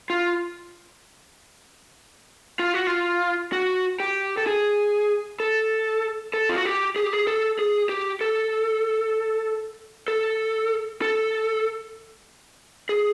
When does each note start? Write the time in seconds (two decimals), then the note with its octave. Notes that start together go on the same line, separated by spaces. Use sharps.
0.10 F4
2.59 F4
2.74 F#4
2.87 F4
3.52 F#4
4.00 G4
4.37 A4
4.47 G#4
5.40 A4
6.34 A4
6.49 F4
6.56 F#4
6.65 G4
6.96 G#4
7.04 G4
7.13 G#4
7.27 A4
7.59 G#4
7.89 G4
8.21 A4
10.08 A4
11.02 A4
12.89 G#4